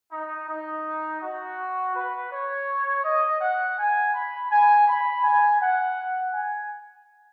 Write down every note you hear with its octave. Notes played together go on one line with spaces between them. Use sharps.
D#4
D#4
F#4
B4
C#5
D#5
F#5
G#5
B5
G#5
B5
G#5
F#5
G#5